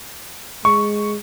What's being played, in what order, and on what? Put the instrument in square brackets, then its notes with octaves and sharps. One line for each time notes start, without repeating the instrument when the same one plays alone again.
[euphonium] G#3 [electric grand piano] C#6